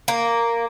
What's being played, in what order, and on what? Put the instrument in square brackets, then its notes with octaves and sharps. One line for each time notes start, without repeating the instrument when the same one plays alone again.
[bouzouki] A#3